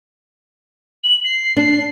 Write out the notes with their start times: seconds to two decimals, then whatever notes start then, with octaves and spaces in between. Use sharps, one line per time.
1.03 F#7
1.24 C7
1.57 D4 C7